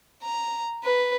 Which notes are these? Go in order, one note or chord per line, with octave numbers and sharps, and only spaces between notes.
A#5
B4